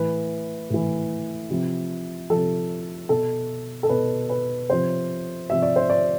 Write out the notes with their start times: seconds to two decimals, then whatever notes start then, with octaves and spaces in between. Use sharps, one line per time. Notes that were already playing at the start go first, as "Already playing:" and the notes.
Already playing: A2 E3 B4
0.70 A2 E3
1.50 C3 F3
2.30 C3 F3 A4
3.09 B2 A4
3.83 A4
3.89 B2 B4
4.30 B4
4.70 C3 F3 C5
5.50 C3 F3 E5
5.62 D5
5.76 C5
5.90 D5